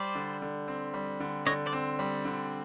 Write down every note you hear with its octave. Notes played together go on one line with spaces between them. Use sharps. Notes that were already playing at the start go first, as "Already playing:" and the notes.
Already playing: G3 C5 D5
D3
D3
C4
G3
D3
D3 C#5 D#5
C5 D5
C4
G3
D3